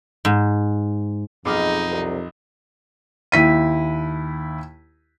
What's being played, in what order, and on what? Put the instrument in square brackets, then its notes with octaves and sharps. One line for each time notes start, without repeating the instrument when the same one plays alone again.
[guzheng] G#2
[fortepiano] B1 D6 F6 [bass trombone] F2 [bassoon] G#3 [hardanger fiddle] D#4
[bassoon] C2
[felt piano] D#2 E4 B6 D#7